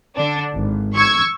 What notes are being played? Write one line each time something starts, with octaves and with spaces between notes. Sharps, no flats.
D3 D4
G#1
C#6 E6 G#6